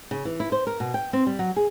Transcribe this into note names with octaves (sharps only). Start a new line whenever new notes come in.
C#3
E3
E4
C5
A#4
B2
G5
C4
G3
F#3
G#4